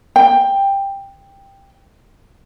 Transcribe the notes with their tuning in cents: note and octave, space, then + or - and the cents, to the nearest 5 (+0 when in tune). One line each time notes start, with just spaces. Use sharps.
G5 +10